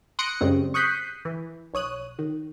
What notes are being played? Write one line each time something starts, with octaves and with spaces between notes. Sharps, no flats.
C6 D#6 F#6 A#6 C#7 D7
F#2 C#3 G3 G#3 C4
C#6 D#6 F#6 G6 B6 C7
E3
B1 C#5 D#6 F#6
D#3